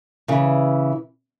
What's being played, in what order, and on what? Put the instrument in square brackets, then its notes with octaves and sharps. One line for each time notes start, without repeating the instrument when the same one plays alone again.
[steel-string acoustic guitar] C#3 E3